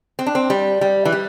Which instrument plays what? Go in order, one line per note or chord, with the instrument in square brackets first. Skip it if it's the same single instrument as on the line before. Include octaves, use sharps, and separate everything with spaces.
[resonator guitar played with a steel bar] C4
D4
C4
G3
G3
E3
G3